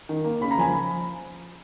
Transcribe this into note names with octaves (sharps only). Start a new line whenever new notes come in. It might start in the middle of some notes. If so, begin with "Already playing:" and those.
D#3
A#3
C#3 B5
A#5
F3 G#5 B5